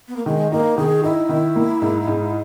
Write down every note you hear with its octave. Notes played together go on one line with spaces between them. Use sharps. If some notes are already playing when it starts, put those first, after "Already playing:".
B3
A#3
D#3 G#3
A#3 D#4
D#3 G#4
D#4 E4
D#3
A#3
G#2
G#2